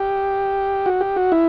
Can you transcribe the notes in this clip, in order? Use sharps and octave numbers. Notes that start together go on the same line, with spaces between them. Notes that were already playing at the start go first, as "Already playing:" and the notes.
Already playing: G4
F#4
G4
F#4
E4